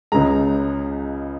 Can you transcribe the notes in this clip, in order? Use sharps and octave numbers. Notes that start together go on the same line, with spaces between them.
C#2 C#3 G#3 A#5